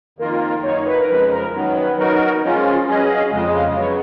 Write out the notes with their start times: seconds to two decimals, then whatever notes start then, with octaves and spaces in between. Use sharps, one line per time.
0.19 F2 D#3 A#3 F4 A#4
0.41 A#4
0.63 F#2 D#3 F#3 A#3 D#4 C#5
0.86 B4
0.99 A#4
1.08 F2 C#3 F3 G#3 B4
1.31 A#4
1.52 F#2 D#3 F#3 B3
1.75 B4
1.97 F#3 B3 D#4 F#4 A#4 C#5
2.42 F3 G#3 C#4 F4 A#4
2.64 G#4
2.86 F#3 C#4 G#4 B4 D#5
3.08 F5
3.30 F2 C#3 G#3 D#5
3.53 F5
3.65 D#5
3.75 C#3 F#3 B3 C#5